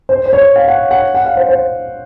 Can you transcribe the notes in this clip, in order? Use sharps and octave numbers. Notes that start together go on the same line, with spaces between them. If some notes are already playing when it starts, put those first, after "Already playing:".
C5
C5
C#5
F5
F#5
F#5
F#5
F5
C5
C5